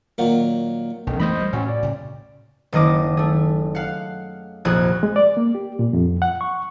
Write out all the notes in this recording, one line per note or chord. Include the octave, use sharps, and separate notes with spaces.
A#2 D#3 F#3
B1 F2 D3 D#3
E3 A3 B3 C5 D#5 B5
G3
A2 C#4 F#4
D5
A2 C#3
F#1 D#3 A#3 D#5 D6
A3 G#4
F5 F#5
F1 A#1 G#4 F#6 G#6
G#3
D5
A#3
G4
A#2
F2
F#5
C#6